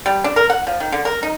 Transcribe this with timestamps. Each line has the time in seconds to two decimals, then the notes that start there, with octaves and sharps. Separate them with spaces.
0.06 G3
0.24 D4
0.36 A#4
0.50 F#5
0.67 F3
0.80 D#3
0.92 D3
1.05 A#4
1.23 D#4